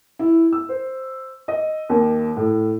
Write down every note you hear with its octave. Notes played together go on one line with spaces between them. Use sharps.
E4
E6
C5
D#5
D#2
A2